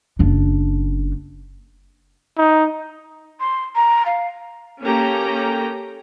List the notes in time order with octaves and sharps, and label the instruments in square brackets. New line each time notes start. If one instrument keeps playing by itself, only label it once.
[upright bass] F#1 D4
[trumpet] D#4
[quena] C6
A#5
F5
[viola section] A#3 C#4 G4 A4 G5 A#5